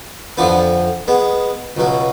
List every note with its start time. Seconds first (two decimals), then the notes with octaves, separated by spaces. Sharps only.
0.37 F2 D3 F3 B3 D4
1.08 G#3 B3
1.77 C#2 B2 F#3